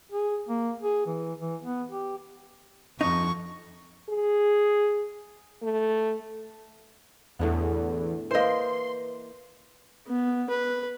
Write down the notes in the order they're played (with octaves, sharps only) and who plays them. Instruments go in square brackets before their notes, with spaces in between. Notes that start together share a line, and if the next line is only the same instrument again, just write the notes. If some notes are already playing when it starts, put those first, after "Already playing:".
[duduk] G#4
A#3
G#4
E3
E3
B3
G4
[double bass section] F2 [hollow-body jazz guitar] D#4 [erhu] C#6
[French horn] G#4
A3
[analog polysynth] E2 [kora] A2 D3 B3
[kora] E3 A#3 [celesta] B4 [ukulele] C5 D#5 [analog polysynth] C6
[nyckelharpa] B3
B4